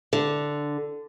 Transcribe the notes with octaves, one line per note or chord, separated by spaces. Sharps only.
D3